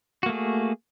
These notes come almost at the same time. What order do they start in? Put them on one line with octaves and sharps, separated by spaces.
F#4 A#3 A3 G#4